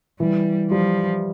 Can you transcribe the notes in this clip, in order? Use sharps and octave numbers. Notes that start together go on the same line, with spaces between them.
E3 G3
F3 G3